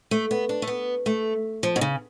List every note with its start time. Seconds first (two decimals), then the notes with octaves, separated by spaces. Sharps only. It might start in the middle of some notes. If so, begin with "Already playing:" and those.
0.11 A3
0.31 B3
0.49 D4
0.62 A3
0.67 B3
1.06 A3
1.63 F3
1.76 B2
1.81 C#3